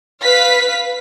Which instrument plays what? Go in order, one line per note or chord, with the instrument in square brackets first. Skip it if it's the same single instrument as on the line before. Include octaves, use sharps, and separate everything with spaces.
[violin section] B4 F5 B6